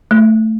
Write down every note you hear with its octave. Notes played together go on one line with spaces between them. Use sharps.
A3